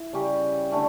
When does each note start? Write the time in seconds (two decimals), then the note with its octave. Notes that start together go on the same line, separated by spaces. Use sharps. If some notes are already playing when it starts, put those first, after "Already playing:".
Already playing: E4
0.13 C#3 G3 C#4 G4
0.71 D3 A3 C#4